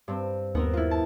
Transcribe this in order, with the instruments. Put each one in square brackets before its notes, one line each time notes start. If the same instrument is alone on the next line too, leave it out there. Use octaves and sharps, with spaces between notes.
[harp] G2 C4
[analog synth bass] D#2 [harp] B3 C4 A#4
[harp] E4 F4
A5